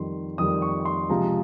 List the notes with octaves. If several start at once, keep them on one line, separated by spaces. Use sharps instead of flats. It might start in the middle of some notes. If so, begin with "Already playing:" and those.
Already playing: F2 D#3 G3 C6
F2 D#3 G3 D#6
C#6
C6
C#2 C3 F3 G#3 A#5